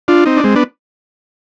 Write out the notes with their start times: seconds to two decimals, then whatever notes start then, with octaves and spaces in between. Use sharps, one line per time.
0.08 D4 F4
0.25 C4 D#4
0.37 D4
0.44 G#3 C4
0.56 B3 D4